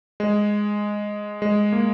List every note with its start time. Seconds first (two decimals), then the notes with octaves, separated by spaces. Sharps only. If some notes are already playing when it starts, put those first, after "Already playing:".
0.20 G#3
1.42 G#3
1.72 A#3